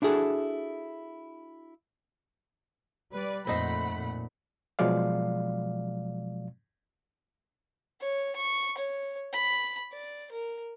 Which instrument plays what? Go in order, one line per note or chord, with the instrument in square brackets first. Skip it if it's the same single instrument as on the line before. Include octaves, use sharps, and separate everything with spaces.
[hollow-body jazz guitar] D4 E4 F#4 G#4 A4
[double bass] G3 [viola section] B4 D5
[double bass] F2 A#2 [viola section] A3 F#5 B5 [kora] C4 D#4 C5
[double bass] A#2
[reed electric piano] B2 F3 F#3 G#3 D5 F5
[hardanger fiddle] C#5
C#6
C#5
B5
D5
A#4